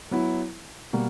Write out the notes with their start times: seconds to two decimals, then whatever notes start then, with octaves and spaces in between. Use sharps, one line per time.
0.11 F#3 B3 E4
0.93 B2 G3 A#3